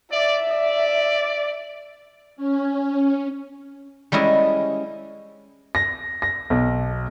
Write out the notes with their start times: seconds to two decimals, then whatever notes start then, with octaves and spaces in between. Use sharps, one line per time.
0.12 D5 E5
0.50 D5
2.36 C#4
4.12 G3 G#3 C#4 E4 D#5
5.75 A#6
6.22 A#6
6.50 B1